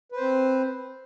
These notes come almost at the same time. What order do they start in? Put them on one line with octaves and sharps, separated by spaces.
B4 C5 C4